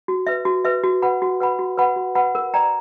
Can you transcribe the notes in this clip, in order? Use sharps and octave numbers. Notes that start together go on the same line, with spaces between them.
F#4
B4 E5
F#4
B4 E5
F#4
B4 F#5 B5
F#4
B4 F#5 B5
F#4
B4 F#5 B5
F#4
B4 F#5 B5
A#4
D5 G5 A#5